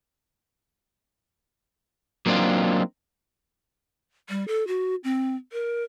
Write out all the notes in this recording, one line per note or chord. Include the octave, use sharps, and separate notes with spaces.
F#3 A#3 C4 D4 D#4 F4
G3
A4
F#4
C4
A#4